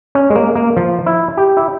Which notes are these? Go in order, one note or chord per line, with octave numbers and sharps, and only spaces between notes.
C#4
G#3
A#3
A#3
F3
E4
G4
E4